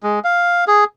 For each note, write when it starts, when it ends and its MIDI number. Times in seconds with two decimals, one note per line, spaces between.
0.03 0.19 56
0.24 0.64 77
0.68 0.84 68